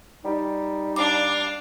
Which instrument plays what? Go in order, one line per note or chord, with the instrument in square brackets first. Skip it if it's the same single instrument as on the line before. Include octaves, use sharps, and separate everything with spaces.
[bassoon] G3 [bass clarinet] D#4
[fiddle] D4 F5 [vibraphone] D6